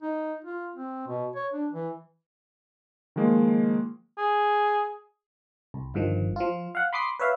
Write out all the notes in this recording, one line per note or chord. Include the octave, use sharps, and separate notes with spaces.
D#4
F4
C4
B2
C#5
D4
E3
D#3 F3 G#3 A#3
G#4
C2
G1 G2 D#3 F3
F3 F4
F5 F#5
B5 C6 D6 D#6 C7
B4 C#5 E5 F5